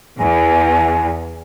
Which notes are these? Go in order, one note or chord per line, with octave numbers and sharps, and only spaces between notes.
E2 G#5